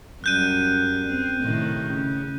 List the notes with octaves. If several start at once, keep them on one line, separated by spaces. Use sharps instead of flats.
F#2 G3 F#6 G6 D#7
C4
A2 C3 D#3
C#3